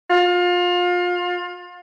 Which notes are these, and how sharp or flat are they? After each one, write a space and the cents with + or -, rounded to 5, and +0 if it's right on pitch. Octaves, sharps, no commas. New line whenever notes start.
F4 +30